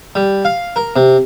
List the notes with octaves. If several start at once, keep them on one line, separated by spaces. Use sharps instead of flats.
G3
F5
A#4
C3